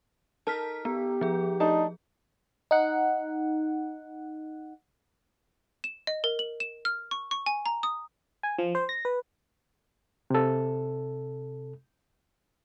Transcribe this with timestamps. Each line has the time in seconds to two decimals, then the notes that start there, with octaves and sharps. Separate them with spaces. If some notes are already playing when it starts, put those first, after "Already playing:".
0.47 D#4 A4 A#4 A5 F6 B6
0.85 B3 G4
1.21 F3 G#4
1.60 A3 D4 D#4 A5
2.71 D#4 F#5
5.84 E7
6.07 D#5
6.24 A#4
6.39 F#7
6.60 E7
6.85 F6
7.11 C#6
7.31 C#6
7.46 G#5
7.66 A#5
7.83 D#6
8.43 G#5
8.58 F3
8.75 C5
8.89 A#6
9.05 B4
10.30 C3 A4